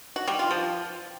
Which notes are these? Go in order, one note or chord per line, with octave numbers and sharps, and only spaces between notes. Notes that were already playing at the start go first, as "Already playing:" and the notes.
F#4
G3
F4
F3